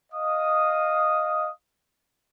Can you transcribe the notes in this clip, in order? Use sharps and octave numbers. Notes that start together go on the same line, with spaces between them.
D#5 F5 D#6